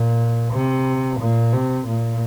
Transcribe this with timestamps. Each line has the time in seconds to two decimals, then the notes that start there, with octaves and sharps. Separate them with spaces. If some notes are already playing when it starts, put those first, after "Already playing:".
Already playing: A#2
0.52 C3
1.20 A#2
1.53 C3
1.87 A#2